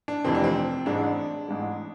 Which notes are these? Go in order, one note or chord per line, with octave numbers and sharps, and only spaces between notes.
D4
F1 F2 C3 E3 C4
D4
C4
A1 G#2 G#3 D4
A1 G#2 G#3